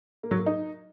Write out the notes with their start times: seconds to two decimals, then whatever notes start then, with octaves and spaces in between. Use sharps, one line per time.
0.23 A#3
0.31 F#3
0.39 A#3
0.46 D#4